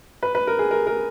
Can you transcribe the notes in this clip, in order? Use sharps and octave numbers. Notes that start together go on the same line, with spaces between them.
B4
B4
A#4
G#4
A#4
A#4